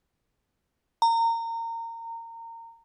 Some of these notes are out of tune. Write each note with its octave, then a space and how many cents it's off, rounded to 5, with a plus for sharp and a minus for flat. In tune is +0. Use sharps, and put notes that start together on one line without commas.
A#5 -25